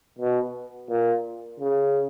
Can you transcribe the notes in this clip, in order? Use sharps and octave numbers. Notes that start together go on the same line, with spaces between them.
B2
A#2
C#3